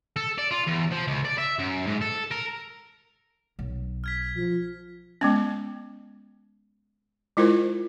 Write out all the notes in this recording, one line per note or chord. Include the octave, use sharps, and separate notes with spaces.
A4
D5
F4
E2
F3
C#2
D5
E5
F#2
G#2
A4
A#4
B1
F6 G#6 B6
F3
G#3 B3 C#4
G#3 E4 F4 A#4 C5